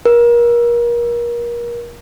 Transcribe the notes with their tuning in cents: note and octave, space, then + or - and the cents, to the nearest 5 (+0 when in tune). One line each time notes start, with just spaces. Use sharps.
A#4 +30